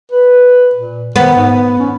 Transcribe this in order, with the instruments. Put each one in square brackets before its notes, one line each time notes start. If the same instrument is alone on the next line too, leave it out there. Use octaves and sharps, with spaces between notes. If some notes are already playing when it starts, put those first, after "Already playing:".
[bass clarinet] B4
A#2
[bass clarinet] D#3 [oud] B3
[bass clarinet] G#2
C#4